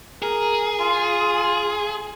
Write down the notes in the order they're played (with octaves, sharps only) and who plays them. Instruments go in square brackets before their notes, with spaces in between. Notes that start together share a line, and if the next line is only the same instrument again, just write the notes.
[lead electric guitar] G#4 [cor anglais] A#4
[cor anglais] F4